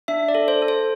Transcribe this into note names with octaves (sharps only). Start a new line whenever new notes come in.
D4 E5
D5
A4
C5
A4
C5